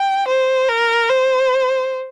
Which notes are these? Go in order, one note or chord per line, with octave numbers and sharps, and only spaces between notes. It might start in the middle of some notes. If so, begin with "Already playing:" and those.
Already playing: G5
C5
A#4
C5